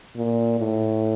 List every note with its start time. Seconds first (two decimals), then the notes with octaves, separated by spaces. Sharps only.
0.16 A#2
0.59 A2